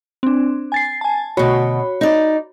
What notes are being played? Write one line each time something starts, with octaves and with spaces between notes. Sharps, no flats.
C4 D4
G#5 A6 C7
G#5 A5
D2 B2 F#4 C#5 B5
D#4 D5